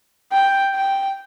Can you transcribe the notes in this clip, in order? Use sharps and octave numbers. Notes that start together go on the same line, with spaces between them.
G5
G5